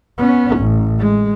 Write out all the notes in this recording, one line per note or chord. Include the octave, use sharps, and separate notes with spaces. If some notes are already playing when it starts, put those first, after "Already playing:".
B3 C#4
A1
G#3